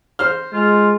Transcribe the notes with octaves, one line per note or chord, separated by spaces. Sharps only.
C5 F6
G#3 F4